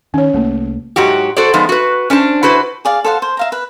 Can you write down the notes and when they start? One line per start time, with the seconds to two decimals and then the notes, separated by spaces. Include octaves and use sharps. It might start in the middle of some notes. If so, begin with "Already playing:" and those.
0.14 D#3 C#4 C#5
0.34 C2 A3 A#3
0.96 G#2 F#3 F#4 G4
1.37 F#4 A4 C5 D5
1.54 F3 G#3 B3 D#4
1.69 F#4 B4
2.10 C#4 D4 C5 A5
2.43 E4 F#4 B4 C5
2.85 G#4 D5 F5
3.05 A4 C5 F5 F#5
3.22 C5
3.37 E5 F5 A#5
3.52 B4